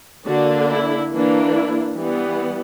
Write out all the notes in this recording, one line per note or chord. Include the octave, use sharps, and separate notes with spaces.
D3 A#3 D4 F#4
E4
E3 A#3 D4
E4
E3 G3 B3